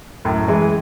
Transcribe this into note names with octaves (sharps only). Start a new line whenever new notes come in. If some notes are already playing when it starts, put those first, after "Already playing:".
F#2 A2
E3 G#3